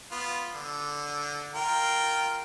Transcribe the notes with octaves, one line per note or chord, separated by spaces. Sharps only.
B3 F4
D3
F4 A#4 G5